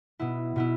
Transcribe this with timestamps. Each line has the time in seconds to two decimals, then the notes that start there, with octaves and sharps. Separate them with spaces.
0.19 B2 B3 E4
0.56 B2 B3 E4